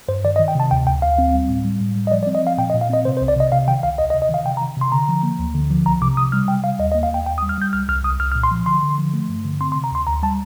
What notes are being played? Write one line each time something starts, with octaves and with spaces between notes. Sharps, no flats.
G2 C5
D#3 D5
D#5
D#3
G5
C3 A5
D2 G5
D2 G5
D2 F5
C4
G3
A2
G3
A2
G3
D#5
F3 D5
D5
C4
D#5
F3 F5
A#2 G5
D#5
A#2
F5
C4 D#5
C3 C5
C5
C2
D5
C3 D#5
C3 F5
D#3 G5
C2 F5
D2 D#5
D#5
C3
D#5
D#3 F5
C3 G5
A#5
D#3
C3 C6
D3 A#5
F3
A#3
D2
D3
F3
C2 A#5
C3 D6
C3 D#6
G3 F6
C3 G5
G3 F5
D#2 D#5
D#5
A#3
F5
D#2 G5
D#2 G5
D#6
G3
F6
G3 G6
C2 F6
C2 F6
C2 D#6
C2 F6
F6
A#2
C6
F3
D3 C6
D3
F3
A3
G2
D3
C4 C6
C6
C3
A#5
D2 C6
D2 A#5
G3 A5